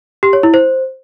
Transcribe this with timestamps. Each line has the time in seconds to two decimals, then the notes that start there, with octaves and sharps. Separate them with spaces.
0.23 G4
0.33 C#5
0.43 E4
0.54 C5